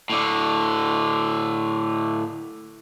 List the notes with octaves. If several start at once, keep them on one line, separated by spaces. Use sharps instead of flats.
A2 D3